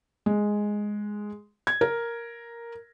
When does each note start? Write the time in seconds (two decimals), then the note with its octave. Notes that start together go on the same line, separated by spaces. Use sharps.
0.26 G#3
1.67 G#6
1.81 A#4